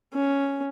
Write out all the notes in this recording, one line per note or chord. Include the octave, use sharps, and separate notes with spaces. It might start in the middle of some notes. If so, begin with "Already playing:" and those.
C#4